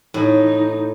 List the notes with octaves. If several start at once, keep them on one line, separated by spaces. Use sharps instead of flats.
A2 D#4